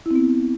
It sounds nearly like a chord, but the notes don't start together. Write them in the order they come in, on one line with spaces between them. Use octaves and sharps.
E4 C4 B3